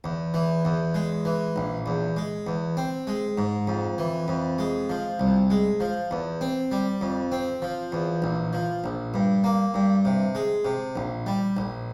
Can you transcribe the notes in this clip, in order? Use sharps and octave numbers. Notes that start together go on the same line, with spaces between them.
E2
E3
E2
G#3
E3
A#1
E2
G#3
E2
C4
G#3
G#2
F2
E3
F2
G#3
F3
C2
G#3
F3
E2
C4
G3
F2
C4
F3
E2
A#1
F3
A#1
G2
A#3
G2
C3
G#3
C3
A#1
G3
A#1